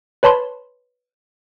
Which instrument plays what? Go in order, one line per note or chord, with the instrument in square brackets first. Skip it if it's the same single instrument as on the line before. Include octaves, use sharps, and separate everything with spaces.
[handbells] B4 C#5 A5 B5 C6